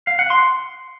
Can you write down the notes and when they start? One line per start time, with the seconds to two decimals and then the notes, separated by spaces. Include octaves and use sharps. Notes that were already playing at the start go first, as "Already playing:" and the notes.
0.07 F5
0.19 F#5
0.30 C6